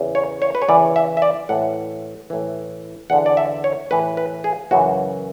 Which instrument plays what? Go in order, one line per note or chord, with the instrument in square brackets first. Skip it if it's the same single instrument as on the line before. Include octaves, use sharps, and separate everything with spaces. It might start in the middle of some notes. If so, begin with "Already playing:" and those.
Already playing: [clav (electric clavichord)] E2 C#3 E3
C#5
C#5
B4
C#5
E2 C#3 E3 D5
E5
E5
D5
A2 E3 F#5
A2 E3
E2 D3 F#5
D5
E5
C#5
A2 E3 B4
B4
G#4
F#2 C#3 E3 F#4